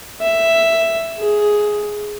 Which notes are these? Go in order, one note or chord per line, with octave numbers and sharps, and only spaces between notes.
E5
G#4